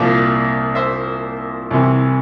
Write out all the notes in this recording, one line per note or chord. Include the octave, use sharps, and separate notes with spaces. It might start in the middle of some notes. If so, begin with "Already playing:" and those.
Already playing: C2 A#2 F3 D5 F5
C5 E5
C2 C3 E3